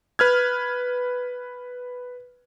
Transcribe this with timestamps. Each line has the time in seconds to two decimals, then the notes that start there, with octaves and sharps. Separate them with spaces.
0.19 B4 F6 G#6